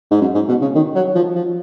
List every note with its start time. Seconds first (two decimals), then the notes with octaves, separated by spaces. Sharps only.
0.11 G#2
0.21 F#2
0.35 G#2
0.48 B2
0.62 C#3
0.75 D#3
0.95 F#3
1.15 F3
1.36 F3